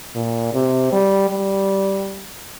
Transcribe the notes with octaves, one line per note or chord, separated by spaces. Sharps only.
A#2
C3
G3
G3